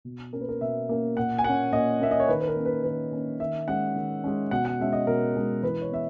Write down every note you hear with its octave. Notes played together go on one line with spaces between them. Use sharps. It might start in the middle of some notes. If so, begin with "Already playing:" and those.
B2
A#3 C#4 A#4
B4
A#4
B2 E5
A#3 C#4
A#2 F#5
G#5
A#3 C#4 F#5
A#2 D#5
A#3 C#4 E5
D#5
C#5
D#3 B4
B4
A#4
A#3 C#4
B4
D#3 B4
A#3 C#4
D#3 E5
G#3 C#4 F#5
D#3
G#3 C#4
B2 F#5
F#5
G#3 C#4 E5
D#5
B2 A#4
G#3 C#4
E3 B4
C#5
B3 E5